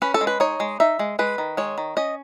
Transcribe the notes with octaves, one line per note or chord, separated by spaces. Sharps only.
C#4 B4
A4
G#3
B4
D#4 C#5
G#3
D#4 E5
G#3
G#3 B4
D#3
G#3 C#5
D#3
C#4 D#5